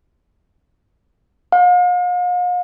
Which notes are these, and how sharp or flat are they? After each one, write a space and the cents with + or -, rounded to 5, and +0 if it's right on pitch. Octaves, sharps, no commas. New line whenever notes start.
F5 +45